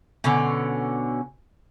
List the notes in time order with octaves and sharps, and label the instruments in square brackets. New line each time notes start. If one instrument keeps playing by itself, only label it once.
[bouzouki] B2 D3 C#4